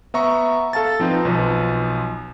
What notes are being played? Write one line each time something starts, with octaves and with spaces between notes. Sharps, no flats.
B3 E5 A#5 C#6
A4 F5 A5 A6
F3 C4 D#4 F4 B4
B1 F3 B4